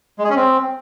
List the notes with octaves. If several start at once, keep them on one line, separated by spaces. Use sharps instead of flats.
G#3
G#4
C#4
C4